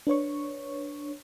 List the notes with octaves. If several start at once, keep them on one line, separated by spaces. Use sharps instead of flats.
D4 B4 C#5 C#6